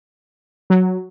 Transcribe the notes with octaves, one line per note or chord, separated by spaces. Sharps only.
F#3